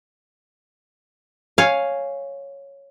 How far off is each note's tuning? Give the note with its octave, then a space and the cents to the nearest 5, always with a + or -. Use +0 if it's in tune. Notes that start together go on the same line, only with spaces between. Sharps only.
C#5 +0 F5 +0 G#5 +0